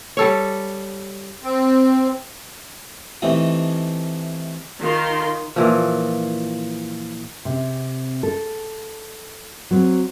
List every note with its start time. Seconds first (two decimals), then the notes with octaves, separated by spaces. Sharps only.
0.17 G3 A4 C#5
1.44 C4
3.22 C3 E3 A3 D#4
4.80 D#3 F4 C6
5.56 A#2 E3 F3
7.45 C3
8.23 A4
9.71 F#3 C4